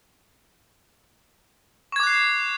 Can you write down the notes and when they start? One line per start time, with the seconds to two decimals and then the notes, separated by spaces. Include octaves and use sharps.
1.92 C#6
1.96 G#6
2.00 D6
2.03 F#6
2.07 C7